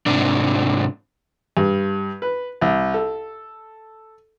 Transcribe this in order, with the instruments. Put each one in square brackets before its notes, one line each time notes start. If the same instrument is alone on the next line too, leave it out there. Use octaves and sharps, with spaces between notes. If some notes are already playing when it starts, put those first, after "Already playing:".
[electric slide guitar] G#2 C3 D4
[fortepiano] G2
B4
C2
A4